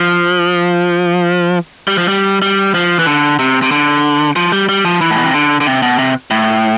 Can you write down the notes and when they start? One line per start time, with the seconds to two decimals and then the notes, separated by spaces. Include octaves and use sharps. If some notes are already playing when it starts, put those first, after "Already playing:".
Already playing: F3
1.88 G3
1.98 F3
2.08 G3
2.42 G3
2.74 F3
2.99 E3
3.06 D3
3.39 C3
3.62 C3
3.71 D3
4.36 F3
4.52 G3
4.69 G3
4.85 F3
5.01 E3
5.11 A2
5.18 B2
5.26 C3
5.34 D3
5.60 D3
5.66 C3
5.82 B2
5.99 C3
6.31 A2